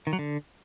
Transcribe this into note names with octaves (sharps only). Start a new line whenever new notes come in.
D#3
F#3
D3